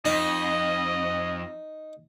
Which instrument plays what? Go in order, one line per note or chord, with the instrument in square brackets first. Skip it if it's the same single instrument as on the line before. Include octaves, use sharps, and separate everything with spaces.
[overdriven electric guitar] F2 [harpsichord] D#4 [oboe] D#5